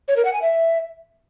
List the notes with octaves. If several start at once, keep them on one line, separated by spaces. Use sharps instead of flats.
C#5
A#4
F#5
G#5
E5